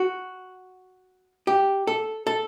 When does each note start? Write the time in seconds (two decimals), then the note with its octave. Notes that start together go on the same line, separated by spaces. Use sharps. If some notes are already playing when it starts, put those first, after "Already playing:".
Already playing: F#4
1.47 G4
1.87 A4
2.27 A4